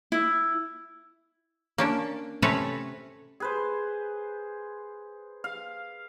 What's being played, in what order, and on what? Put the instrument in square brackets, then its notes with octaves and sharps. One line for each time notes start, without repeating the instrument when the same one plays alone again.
[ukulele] E4
[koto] A#3 C#4 D4
C3 A3 C#4 B4 C#5 A#5
[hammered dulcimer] G#4 B4 C5
F5